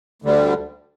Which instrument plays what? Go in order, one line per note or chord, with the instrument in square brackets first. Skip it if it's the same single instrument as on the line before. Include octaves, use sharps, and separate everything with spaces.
[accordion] D2 D3 G3